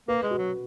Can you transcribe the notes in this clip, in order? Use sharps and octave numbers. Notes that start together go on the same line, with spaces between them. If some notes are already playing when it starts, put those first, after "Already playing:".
A#3 B4
G#3
F#4
F#3